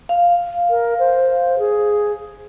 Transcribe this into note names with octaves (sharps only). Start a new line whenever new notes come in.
F5
A#4
C5
G#4